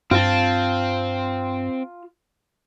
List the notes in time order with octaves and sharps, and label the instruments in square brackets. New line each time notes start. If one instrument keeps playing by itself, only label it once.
[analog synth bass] G2 [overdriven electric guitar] C4 [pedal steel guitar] F4 A5